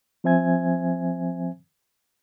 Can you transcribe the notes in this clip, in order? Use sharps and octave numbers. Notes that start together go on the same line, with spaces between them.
F3 C4 C5 E5 G#5 G#6